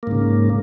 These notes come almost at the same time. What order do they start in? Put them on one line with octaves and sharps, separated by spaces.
A#3 G#2 C#3